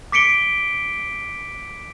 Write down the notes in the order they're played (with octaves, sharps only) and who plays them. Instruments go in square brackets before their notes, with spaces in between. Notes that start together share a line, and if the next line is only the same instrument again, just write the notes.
[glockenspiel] D6 B6 C#7 D7 G7